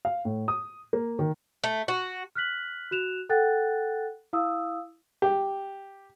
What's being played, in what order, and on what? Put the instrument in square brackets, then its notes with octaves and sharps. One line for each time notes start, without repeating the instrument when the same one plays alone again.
[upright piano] F5
A2
D#6
A#3
D#3
[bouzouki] A3
F#4
[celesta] F6 F#6 B6 F#7
F#4 F#6 E7 F7
A4 F#5 G5 F#6 A6
E4 F5 D#6 E6
[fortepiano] G4